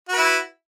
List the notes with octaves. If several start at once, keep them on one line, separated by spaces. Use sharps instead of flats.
E4 F#4 B4